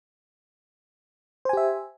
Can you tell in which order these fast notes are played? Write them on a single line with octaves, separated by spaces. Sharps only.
C5 G#5 G4 E5